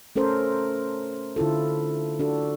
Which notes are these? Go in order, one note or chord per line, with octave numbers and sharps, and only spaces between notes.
A3 C#4 A4 A#4 C5
D3 E4 F4 A4
D4 F#4 A4